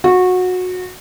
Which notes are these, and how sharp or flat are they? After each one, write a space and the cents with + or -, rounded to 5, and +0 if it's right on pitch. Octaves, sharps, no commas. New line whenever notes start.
F#4 -20